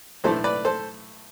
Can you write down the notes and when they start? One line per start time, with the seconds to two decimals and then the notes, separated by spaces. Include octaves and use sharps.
0.24 B1 A2 E3 A3 D4 A4 C5
0.44 B4 D5
0.65 A4 C5